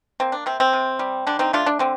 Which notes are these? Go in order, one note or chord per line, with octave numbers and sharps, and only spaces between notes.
A#3 C4
D4
C3 C4
C4
C3
G3
D3 D4
C4 D#4
A3 D4 F4
D4
D3 C4